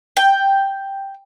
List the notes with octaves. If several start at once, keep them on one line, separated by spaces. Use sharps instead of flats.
G5